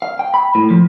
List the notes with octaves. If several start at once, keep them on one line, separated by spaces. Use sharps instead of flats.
F5
G5
B5
A2
F3